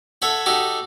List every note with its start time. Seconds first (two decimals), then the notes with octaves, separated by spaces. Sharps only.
0.22 A4 C#5 E5 F#5
0.46 D#4 F#4 G4 A4